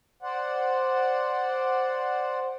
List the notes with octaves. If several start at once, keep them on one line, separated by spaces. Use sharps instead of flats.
C5 D5 F#5